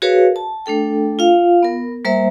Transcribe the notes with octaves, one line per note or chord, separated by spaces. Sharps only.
F#4 G#4 A#4 B4 C#5 F5
A5
A3 D4 A4 G5
F4 F5
B3 A#4
G3 A#3 A#4 C5 E5